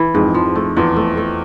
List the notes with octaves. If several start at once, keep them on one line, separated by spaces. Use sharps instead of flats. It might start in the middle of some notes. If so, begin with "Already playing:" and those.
Already playing: E3
F2 G#2
F3
A3
E2 F3
A3
A3